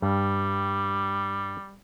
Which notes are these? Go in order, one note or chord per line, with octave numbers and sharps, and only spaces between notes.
G2 G3